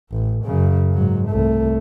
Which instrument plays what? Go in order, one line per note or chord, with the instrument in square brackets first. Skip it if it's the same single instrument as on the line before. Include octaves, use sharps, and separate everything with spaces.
[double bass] A1
F#2 C#3
G#2 F#3
C2 A3